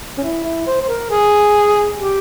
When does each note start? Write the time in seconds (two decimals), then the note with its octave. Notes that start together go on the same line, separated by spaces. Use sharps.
0.18 C#4
0.23 E4
0.44 E4
0.67 C5
0.81 C5
0.89 A#4
1.10 G#4
1.97 G4